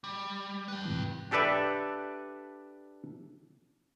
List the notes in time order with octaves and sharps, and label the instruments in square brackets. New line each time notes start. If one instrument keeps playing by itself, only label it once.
[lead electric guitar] G3
B4 G5
[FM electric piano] G#2 C3 E3
[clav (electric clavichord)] D4 G4 A4 B4 D5 E5